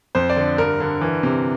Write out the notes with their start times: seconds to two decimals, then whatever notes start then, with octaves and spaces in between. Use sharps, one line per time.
0.15 F2 C5
0.30 D5
0.36 D3
0.58 G2 A#4
0.80 D3
1.01 E3
1.23 C3